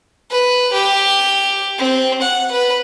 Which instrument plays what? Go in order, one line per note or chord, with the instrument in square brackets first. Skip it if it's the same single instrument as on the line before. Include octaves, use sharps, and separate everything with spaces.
[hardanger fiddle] B4
G4
C4
F#5
B4